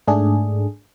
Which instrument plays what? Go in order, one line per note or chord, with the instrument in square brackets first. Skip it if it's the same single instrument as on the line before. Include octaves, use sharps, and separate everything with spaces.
[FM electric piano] G#2 A3 D4 G#4